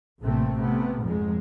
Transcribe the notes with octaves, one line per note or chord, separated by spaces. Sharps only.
A1 C3 A3 A#3 C4
C3 A3 B3
F1 F2 G#2 F3 G#3